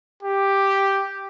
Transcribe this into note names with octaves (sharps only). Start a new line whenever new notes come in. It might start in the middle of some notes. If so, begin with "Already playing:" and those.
G4